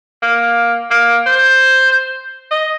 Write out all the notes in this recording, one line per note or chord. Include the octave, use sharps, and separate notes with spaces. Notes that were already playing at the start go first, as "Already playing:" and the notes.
A#3
A#3
C5
D#5